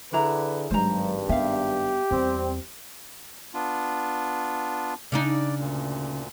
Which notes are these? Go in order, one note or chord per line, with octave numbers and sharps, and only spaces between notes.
D3 D4 E4 G#4 B4 A#5
G#1 G2 F#3 G#3 C5 A#5
B3 G4 E5 F5
E2 G3 C4
B3 D4 F4
C#3 D4 D#4 D5
D2 A#2